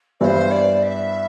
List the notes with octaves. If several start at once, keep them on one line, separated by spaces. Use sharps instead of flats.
G2 E3 G3 B3 E4 C5 D5
D5
E5